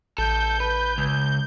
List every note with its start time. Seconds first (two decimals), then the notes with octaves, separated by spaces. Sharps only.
0.18 A1 A4 G6
0.60 B4
0.98 C#2